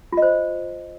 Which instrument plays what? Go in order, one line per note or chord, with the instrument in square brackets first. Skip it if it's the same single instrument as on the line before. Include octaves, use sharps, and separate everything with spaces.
[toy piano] F4
D#5
C5